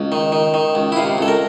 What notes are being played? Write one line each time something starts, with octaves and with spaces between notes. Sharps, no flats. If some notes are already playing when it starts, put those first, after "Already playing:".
Already playing: C#2
D#3
D#3
D#3
C#2
E4
C3 F4
C#2 A4
A#4